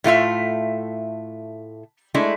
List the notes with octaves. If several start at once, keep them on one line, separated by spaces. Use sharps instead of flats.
A2 A3 F4 E5
G#3 A3 D4 E4